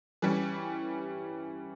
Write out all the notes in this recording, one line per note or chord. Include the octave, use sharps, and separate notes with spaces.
E3 G3 C#4